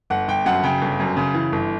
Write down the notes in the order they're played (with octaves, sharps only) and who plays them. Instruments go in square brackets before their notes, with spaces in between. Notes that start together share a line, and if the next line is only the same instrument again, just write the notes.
[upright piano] G1 F#5
G1 G5
F#2 F#5
C#3 G5
G1
F#2
C#3
E3
G1